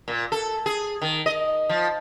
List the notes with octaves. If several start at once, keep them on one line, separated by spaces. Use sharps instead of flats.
A#2
A4
G#4
D#3
D#5
F3